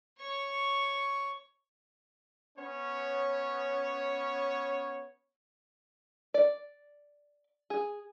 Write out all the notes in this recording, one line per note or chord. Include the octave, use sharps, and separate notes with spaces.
C#5 C#6
B3 C#4 C#5
D5
G#4